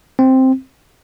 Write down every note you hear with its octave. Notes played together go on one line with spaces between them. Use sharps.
C4